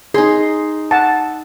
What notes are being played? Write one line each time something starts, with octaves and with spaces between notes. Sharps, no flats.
D#4 G#4 C6
F#5 A5